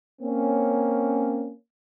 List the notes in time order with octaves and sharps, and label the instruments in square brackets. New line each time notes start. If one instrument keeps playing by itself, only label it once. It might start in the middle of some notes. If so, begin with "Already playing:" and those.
[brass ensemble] A#3 C4 C#4